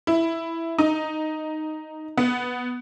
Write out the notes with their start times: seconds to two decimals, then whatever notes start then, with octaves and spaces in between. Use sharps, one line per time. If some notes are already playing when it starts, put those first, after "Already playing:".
0.07 E4
0.78 D#4
2.17 B3